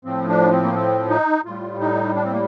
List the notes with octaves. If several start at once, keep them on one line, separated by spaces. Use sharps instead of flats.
A2 F3 C4
D4
C4
A#3
C4
D#4
A2 G3 F4
D#4
D4
C4
A#3